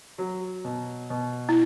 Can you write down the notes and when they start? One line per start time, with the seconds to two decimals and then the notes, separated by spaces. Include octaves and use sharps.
0.18 F#3
0.65 B2
1.10 B2
1.49 E4